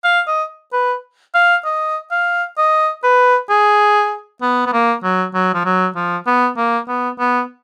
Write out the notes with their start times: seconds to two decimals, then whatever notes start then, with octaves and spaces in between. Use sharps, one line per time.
0.04 F5
0.27 D#5
0.73 B4
1.35 F5
1.65 D#5
2.11 F5
2.58 D#5
3.04 B4
3.50 G#4
4.42 B3
4.66 B3
4.73 A#3
5.03 F#3
5.34 F#3
5.54 F3
5.65 F#3
5.96 F3
6.27 B3
6.57 A#3
6.88 B3
7.19 B3